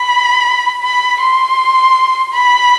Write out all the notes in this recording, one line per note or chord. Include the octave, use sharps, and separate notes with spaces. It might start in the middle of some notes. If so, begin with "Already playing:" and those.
Already playing: B5
B5
C6
B5